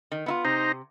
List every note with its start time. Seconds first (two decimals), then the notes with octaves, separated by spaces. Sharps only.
0.12 D#3
0.26 B3 E4 F4
0.45 C3 D#4 C5 A#5